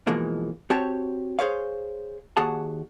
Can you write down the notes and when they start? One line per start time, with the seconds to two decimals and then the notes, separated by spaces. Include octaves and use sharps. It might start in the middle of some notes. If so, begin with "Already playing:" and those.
0.07 B2 E3 F3 G#3 A#3
0.70 C4 F#4 G4 C#5 A5
1.39 G#4 C5 C#5 F5
2.37 D#2 F#4 G#4 F#5 A5